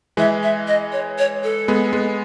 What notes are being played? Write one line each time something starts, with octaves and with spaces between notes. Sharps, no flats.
E3 G#3 E5
E5
D#5
C#5
C#5
A4
G#3 B3
G#3 B3